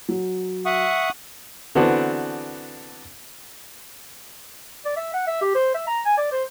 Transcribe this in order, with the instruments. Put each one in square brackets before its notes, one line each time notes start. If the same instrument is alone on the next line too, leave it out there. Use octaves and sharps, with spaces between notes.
[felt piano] F#3 F#4
[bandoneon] E5 [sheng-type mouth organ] F#5 C#6 D#6
[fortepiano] D3 E3 B3 C4 D4 F#4
[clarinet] D5
E5
F#5
E5
G4
C5
E5
A#5
G#5
D5
C5